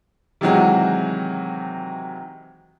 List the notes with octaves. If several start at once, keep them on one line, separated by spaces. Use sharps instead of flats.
C3 D#3 E3 F#3 G#3 F#4